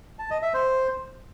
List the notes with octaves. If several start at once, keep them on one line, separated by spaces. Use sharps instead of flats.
A5
D#5
E5
C5